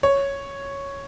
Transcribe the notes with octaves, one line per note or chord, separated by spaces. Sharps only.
C#5